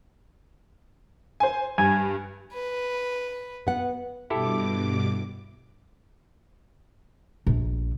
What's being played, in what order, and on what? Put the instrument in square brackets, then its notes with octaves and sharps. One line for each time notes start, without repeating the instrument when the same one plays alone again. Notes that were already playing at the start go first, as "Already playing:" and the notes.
[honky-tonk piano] C5 G#5
[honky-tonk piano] G2 [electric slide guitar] G#5
[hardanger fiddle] B4
[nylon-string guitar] B3 F#5
[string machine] G2 B2 D6 [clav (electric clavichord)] E4 G4 A4
[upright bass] A#1